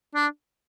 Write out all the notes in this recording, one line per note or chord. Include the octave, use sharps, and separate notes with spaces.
D4